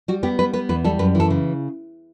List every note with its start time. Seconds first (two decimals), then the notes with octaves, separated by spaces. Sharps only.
0.08 G3 F#4
0.23 B3 G4
0.39 G3 B4
0.53 B3 B4
0.69 E2 B4
0.84 G3 A4
0.99 F#2 B4
1.15 E3
1.20 A4
1.30 C#3